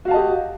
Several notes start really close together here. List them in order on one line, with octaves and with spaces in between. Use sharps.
F#4 F5 A5 D#5 G4